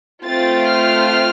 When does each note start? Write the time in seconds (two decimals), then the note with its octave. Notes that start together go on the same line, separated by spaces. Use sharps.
0.24 A3 C4 F4 A6
0.70 F6